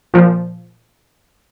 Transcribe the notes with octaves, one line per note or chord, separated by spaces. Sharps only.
A#2 F3